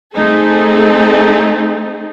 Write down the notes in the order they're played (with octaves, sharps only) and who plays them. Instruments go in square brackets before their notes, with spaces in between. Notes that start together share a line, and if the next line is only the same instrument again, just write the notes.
[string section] A3 C4 D#4 G#4 A4